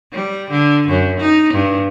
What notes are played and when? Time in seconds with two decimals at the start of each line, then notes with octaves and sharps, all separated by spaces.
0.13 G3
0.51 D3
0.88 F#2
1.20 D#4
1.53 G2